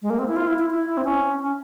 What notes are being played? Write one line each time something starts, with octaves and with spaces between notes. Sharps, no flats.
G#3
A#3
C4
E4
F4
E4
E4
E4
C4
C#4
C#4